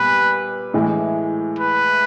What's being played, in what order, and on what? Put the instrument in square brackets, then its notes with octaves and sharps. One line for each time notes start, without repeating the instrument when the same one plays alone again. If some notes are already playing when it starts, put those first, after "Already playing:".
Already playing: [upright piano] A#2 G3 B3 [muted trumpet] B4
[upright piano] A2 E3 G#3
[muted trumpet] B4